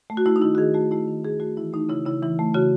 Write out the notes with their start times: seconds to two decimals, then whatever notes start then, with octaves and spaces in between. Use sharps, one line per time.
0.10 A3
0.17 F#4
0.26 A3 E4
0.36 D#4
0.41 D#3 E4
0.55 F#4
0.58 D#3 G#4
0.74 A3 F#4
0.91 A3 E4
1.08 D#3
1.24 D#3 G#4
1.40 A3 F#4
1.57 E3 E4
1.73 A3 D#4
1.89 C#3 E4
2.05 C#3 E4
2.22 E3 E4
2.39 A3
2.54 C#3 F#4